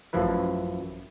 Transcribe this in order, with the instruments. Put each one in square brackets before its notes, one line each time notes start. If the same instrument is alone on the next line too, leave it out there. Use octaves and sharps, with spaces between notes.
[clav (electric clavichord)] A1 F#2 F3 E4 B4